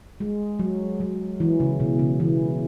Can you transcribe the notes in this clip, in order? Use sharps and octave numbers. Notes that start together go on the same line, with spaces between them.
G#3
F#3
F#3
E3
C#3
B2
C#3
E3